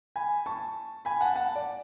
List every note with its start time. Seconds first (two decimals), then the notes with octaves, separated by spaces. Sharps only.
0.16 G#5 B5
0.46 A5 C#6
1.05 G#5 B5
1.21 F#5 A5
1.35 F#5 A5
1.55 D5